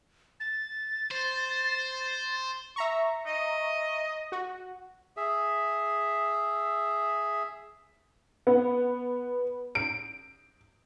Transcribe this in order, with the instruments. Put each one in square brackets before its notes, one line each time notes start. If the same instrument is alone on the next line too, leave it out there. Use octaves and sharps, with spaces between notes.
[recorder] A6
[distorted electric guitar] C5
[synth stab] E5 A#5 C#6
[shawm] D#5
[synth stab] F#4
[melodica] G#4 E5
[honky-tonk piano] B3
D7